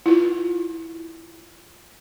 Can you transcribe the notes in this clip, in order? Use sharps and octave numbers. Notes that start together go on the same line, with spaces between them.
E4 F4